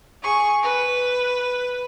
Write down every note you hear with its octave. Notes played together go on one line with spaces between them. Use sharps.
G#4 C#6
B4